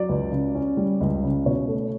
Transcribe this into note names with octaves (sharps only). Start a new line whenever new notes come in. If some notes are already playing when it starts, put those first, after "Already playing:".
Already playing: F#3 D5
C#2
C#3
C#4
G3
C#2
C#3
B2 C#5
A3